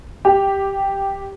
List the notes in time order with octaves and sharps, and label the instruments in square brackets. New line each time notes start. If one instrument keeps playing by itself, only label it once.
[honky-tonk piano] G4